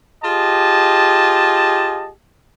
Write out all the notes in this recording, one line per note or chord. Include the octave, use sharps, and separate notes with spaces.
F4 G4 G#4 D#5 A5